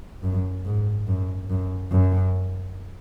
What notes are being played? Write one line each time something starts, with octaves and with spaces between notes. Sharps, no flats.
F#2
G#2
F#2
F#2
F#2